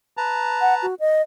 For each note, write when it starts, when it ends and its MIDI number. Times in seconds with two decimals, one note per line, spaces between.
0.17 0.86 71
0.17 0.86 81
0.17 0.86 82
0.61 0.74 78
0.82 0.95 66
1.00 1.22 75